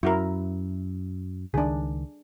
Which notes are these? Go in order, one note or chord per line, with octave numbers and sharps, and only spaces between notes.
F#2 E4 F#4 A#4
C#2 D#3 D4 G#4